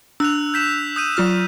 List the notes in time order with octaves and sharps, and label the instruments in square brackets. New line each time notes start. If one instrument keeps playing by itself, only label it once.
[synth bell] D4 [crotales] E6 F#6 F7
[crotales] G6 B6 E7
D#6 G6 D#7
[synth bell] F#3 F4 F6